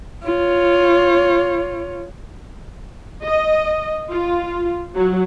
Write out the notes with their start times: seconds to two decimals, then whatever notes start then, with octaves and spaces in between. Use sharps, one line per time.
0.24 F4 C#5
3.25 D#5
4.10 F4
4.95 F#3